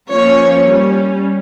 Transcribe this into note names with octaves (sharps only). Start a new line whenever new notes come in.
F3 A#3 C#4 C#5
G3 C#4